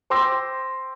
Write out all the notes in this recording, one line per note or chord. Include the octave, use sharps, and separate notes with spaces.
C5 G5 C6 D6 E6 A#6